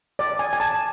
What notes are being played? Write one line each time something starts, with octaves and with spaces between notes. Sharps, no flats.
D5
G#5
G#5
A5